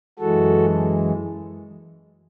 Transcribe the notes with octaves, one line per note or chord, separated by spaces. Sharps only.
F#2 E3 G#3 F#4 A4